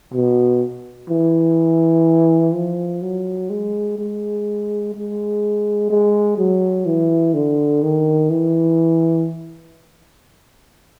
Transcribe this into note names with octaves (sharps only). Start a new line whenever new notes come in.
B2
E3
F3
F#3
G#3
G#3
G#3
G#3
F#3
E3
D3
D#3
E3